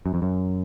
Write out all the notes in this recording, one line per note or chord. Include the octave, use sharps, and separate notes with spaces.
F#2
F2
F#2